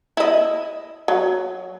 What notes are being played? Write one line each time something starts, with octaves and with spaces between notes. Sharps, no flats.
E4 D#5
F#3